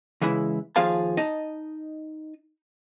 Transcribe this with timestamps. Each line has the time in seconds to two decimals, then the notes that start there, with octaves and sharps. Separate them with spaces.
0.22 C#3 E3 G#3 E4
0.76 D#2 F3 F4 G#4 F5 A5
1.17 D#4 D#5 A5